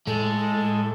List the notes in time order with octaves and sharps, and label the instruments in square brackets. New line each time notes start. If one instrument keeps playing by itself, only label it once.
[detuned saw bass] A2 [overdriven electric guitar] G#3 [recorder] A4